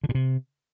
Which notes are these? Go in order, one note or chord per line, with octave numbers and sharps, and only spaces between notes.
D3
A#2
C3